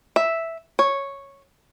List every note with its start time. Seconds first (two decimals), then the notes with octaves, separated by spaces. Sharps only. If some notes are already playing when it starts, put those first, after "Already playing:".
0.16 E5
0.79 C#5